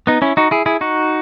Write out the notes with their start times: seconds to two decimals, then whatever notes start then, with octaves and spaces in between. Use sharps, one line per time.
0.07 B3 D#4
0.22 C#4 E4
0.37 D#4 F#4
0.51 E4 G#4
0.66 E4 G#4
0.81 D#4 F#4